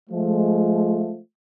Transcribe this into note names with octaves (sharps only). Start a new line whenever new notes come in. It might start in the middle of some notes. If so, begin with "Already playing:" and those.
F3 G#3 A3